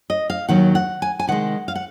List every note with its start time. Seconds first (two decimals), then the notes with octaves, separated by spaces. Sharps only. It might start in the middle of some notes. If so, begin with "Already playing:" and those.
0.10 D#5
0.30 F5
0.48 D#2 D#3 F#3 F#5
0.75 F#5
1.02 G#5
1.19 G#5
1.27 C3 D#3 G#3 F#5
1.68 F5
1.75 F#5